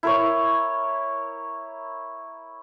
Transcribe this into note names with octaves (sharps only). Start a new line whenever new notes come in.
E4 A#4 C#5